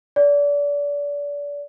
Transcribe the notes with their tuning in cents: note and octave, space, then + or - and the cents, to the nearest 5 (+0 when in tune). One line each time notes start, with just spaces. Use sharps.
D5 -30